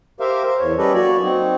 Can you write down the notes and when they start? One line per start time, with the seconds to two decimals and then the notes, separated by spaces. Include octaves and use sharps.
0.20 G4 A#4 C5 E5 F5
0.44 C5
0.59 E2 C#5
0.78 G3 C#4 G4 A4 B4 D#5
0.94 F#3 A#3 F#4 C#5 D5
1.24 C4 D#4